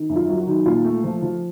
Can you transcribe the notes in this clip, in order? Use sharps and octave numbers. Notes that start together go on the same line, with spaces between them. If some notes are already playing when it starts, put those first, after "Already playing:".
Already playing: D#3
F#2
F4
F#3
F#4
D#3
A#2 F4
A3
F3
F3